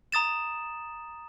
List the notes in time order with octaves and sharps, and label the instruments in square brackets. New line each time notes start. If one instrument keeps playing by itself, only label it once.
[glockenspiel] A#5 D#6 A6 E7